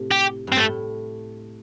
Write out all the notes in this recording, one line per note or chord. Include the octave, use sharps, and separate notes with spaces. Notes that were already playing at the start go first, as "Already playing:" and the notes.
Already playing: A2 C3
G4
G2 C4
A2 A3